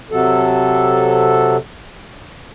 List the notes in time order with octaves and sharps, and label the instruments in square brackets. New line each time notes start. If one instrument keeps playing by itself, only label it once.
[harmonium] C3 F#3 A4